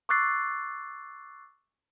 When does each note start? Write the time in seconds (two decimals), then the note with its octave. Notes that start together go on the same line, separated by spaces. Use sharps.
0.09 C#6 D6 E6 F#6 A6 C7